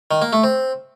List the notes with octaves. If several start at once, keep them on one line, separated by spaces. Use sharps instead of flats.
D#3
A#3
A3
C4